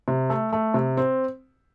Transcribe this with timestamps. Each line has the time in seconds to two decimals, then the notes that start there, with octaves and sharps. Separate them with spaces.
0.08 C3
0.30 A3
0.52 A3
0.74 C3
0.97 C4